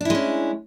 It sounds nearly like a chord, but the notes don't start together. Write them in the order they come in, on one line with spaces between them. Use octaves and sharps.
D4 E4 G#3 C#4